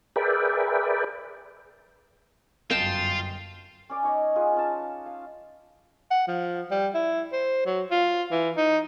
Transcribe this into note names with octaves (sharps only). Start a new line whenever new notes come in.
G#4 A#4 B4 D5 E5 G5
G1 F#2 F4 D#5 G5 A5
C#4 D5 D6
D#4 C#5 D#5
F4 G#4 B4
C#4 A5
F5
F#5
F3
G3
E4
C5
F#3
F4
E3
D#4